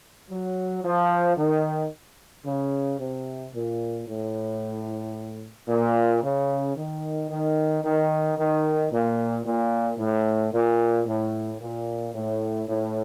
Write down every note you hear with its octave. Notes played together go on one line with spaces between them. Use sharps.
F#3
F3
D#3
C#3
C3
A#2
A2
A#2
C#3
D#3
D#3
D#3
D#3
A#2
A#2
A2
A#2
A2
A#2
A2
A2